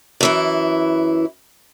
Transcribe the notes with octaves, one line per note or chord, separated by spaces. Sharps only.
F#2 E3 E4